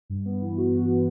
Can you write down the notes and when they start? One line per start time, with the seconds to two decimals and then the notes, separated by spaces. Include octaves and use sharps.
0.10 G2
0.25 B3
0.41 E3
0.58 F#4
0.72 G2
0.88 B3